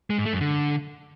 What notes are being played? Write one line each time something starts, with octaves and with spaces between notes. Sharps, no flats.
G#3
G#2
A3
F#2
D3